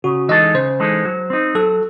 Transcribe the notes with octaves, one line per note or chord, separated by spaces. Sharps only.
C#3 F#4
E3 G#3 D#4 A4 D#5
C#3 C5
E3 G#3 D#4 A4
F#3
C4 D#4
F#3 A4